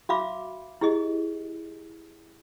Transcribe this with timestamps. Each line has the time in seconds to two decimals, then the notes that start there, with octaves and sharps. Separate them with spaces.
0.09 F#4 E5 F5 B5 D6
0.81 E4 G4 G#4 D#5